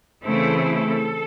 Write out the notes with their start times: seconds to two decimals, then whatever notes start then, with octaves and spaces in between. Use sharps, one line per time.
0.23 C#3 E3 A3 C4 E4 A4
0.71 A4